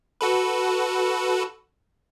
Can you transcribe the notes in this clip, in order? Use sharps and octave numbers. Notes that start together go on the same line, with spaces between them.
F#4 A4 B4